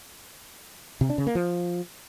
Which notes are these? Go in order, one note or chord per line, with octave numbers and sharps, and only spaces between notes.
C3
D4
C#3
A#3
F3